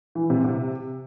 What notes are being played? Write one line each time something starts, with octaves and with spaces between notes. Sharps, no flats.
E3
C3
C3